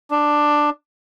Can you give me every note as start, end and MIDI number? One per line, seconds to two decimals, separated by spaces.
0.11 0.70 62